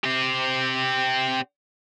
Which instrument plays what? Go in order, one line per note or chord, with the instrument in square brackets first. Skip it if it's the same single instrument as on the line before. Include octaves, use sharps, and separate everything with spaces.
[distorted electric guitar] C4 G4